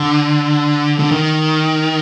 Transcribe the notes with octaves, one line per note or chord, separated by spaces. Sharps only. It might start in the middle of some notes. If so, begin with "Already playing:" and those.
Already playing: D3
D3
D#3